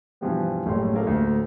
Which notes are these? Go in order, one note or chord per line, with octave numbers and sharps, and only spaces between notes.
G2 B2 E3 F3 G3 B3
F#1 A2 G3 C#5 C6
F3 G#3 A#3 A4 A#4 F5
D2 A2